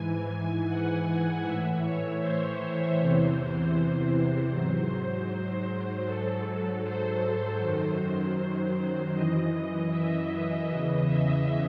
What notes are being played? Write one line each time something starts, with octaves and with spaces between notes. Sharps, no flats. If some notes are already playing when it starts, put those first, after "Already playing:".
Already playing: G#2 E3 G#5
F#5
A2 E3 E5
C#5
C5
E2 C3 E3 C5
G#2 F#3
C5
G#2 F#3 A4
C5
F#2 D#3 F#3
F#2 E3 D#5
E5
E2 C#3 E3 D#5
E5